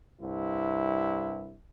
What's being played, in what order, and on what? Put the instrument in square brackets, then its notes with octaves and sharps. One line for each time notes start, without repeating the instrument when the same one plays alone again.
[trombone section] C2 G2 E4